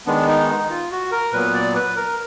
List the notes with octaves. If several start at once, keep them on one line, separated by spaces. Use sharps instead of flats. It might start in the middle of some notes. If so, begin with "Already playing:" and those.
D#3 G#3 B3 D4
D#4
D#4
F4
F#4
A#4
A#2 F#3 B3 B4
D5
B4
A#4